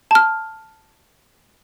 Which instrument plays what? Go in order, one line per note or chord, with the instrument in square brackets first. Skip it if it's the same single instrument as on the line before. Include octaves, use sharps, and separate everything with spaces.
[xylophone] A5 F6